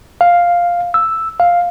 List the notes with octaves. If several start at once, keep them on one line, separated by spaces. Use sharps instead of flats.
F5
E6
F5